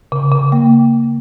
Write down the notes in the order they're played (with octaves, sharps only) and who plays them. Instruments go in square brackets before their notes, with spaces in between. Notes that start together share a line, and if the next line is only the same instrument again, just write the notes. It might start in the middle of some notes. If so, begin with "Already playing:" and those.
[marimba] C#3
C#3
A#3